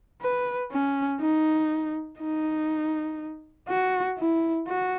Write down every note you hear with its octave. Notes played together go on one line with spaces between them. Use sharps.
B4
C#4
D#4
D#4
F#4
E4
F#4